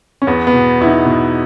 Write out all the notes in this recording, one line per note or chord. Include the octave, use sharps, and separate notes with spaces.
C#4
E2 B3
B3
B2
E2 E4
D#4
B2